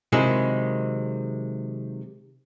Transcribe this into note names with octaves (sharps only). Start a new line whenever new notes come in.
C3 D#3 F#3 G#3 E4